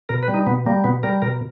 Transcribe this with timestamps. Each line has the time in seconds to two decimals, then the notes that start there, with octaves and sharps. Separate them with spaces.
0.09 B2 A#4
0.23 B4
0.28 G3
0.34 D#4
0.46 B2 B3
0.66 G3 A#3
0.84 B2 B3
1.03 G3 A#4
1.22 B2 A#4